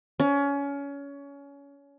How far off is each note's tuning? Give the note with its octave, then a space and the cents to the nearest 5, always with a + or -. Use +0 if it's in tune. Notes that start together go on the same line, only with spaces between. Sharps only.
C#4 +25